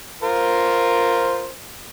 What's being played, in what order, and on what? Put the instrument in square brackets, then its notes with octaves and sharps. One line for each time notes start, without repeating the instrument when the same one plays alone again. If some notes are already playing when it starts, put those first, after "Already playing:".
[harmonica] F4 A#4 C5